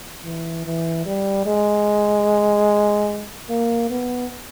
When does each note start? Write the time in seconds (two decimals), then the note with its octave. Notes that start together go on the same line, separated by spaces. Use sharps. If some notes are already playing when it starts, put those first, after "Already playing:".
0.24 E3
0.65 E3
1.05 G3
1.46 G#3
3.49 A#3
3.90 B3